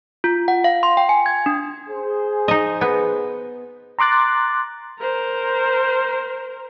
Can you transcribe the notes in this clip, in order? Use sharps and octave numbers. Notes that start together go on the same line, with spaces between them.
F4
F#5
F5
C6
G5
G#5
G#6
D4
G#4 C5
D#4 D#5
B3
A#5 C6 D6 F#6 A6
A#4 C5